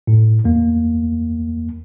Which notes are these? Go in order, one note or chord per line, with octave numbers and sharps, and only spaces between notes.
A2
E2 A#3